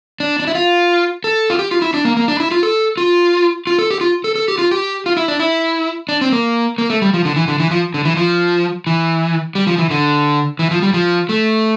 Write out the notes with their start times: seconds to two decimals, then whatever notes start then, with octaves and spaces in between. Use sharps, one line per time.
0.20 D4
0.39 D4
0.47 E4
0.55 F4
1.24 A4
1.50 F4
1.59 G4
1.71 F4
1.82 E4
1.94 D4
2.05 A#3
2.17 A#3
2.28 D4
2.40 E4
2.51 F4
2.63 A4
2.97 F4
3.67 F4
3.79 A4
3.91 G4
4.01 F4
4.24 A4
4.35 A4
4.48 G4
4.59 F4
4.71 G4
5.06 F4
5.17 E4
5.28 D4
5.39 E4
6.09 D4
6.21 C4
6.32 A#3
6.78 A#3
6.90 A3
7.02 G3
7.14 F3
7.25 D3
7.36 E3
7.48 D3
7.60 E3
7.71 F3
7.94 D3
8.05 E3
8.17 F3
8.87 E3
9.55 G3
9.67 F3
9.78 E3
9.90 D3
10.59 E3
10.71 F3
10.83 G3
10.93 F3
11.29 A3